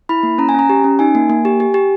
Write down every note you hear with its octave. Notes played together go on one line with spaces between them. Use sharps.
E4 B5
A#3
C#4 A#5
G#5
C#4 A#5
G4
C#4
D#4 G#5
A#3
A#3
G4
G4
G4